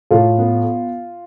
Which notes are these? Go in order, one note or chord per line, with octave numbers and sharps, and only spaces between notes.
A2 F4
B3